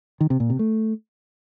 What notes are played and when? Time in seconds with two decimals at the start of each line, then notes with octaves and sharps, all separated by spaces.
0.21 D#3
0.30 C3
0.40 A#2
0.50 C3
0.59 A3